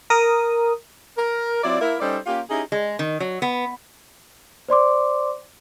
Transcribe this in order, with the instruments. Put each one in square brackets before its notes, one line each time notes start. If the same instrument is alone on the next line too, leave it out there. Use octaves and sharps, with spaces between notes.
[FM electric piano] A#4 D#6
[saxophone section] A#4
F#3 C4 E4 F4 D5
A#3 E4 A#4
G3 C#4 D#4 A4 C5 D5
A#3 C#4 F4 G4
C#4 D#4 E4 G4 G#4
[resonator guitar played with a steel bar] G#3
D#3
F#3
B3
[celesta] C5 D5 C6 D6